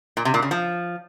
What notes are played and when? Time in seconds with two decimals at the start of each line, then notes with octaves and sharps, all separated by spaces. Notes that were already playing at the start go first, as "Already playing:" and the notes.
0.17 A#2
0.25 C3
0.34 A#2
0.42 C#3
0.51 F3